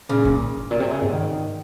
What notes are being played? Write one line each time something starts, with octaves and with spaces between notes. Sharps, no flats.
A#2 C#3
D#3
G#2
A#2
C3
C#3
G#2
D#3